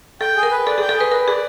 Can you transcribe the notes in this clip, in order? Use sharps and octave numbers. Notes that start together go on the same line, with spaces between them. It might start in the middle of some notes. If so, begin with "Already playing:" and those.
A4 G5
G#4
A#4
B4
A4 D5
G#4
G5
A4
G#4 B4
A#4 B4
G#4 D5